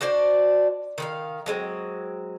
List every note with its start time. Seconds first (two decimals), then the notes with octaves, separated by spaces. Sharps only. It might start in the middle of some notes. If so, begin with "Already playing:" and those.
0.01 D4 F#4 C5 D5
0.98 D#3 B4 F5
1.46 F#3 G#3 C4